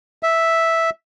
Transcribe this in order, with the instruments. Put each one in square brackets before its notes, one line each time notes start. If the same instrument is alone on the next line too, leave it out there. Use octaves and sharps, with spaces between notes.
[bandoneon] E5